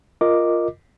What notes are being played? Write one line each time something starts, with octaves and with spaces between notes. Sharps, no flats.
F4 A#4 D#5 D6